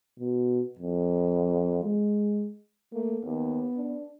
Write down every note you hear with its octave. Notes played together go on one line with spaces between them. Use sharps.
B2
F2
G#3
A3 A#3
D#2 B3
D4